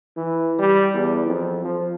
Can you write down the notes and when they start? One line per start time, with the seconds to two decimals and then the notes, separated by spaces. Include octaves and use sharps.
0.17 E3
0.59 G3
0.94 E2
1.26 F2
1.65 F3